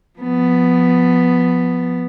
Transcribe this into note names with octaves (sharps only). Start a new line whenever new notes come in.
F3 B3